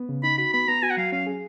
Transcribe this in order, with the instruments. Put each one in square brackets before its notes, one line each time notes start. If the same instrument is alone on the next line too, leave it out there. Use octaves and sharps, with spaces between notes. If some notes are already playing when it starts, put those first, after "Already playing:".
Already playing: [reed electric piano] B3
C#3
[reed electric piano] D#4 [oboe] B5
[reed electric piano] F#4 [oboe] B5
[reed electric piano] B3 [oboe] B5
[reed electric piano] B3 [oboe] A#5
[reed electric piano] F#4 [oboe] G#5
[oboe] F#5
[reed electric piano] F#3 [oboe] F5
[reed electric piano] C#4 [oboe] F5
[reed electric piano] G#4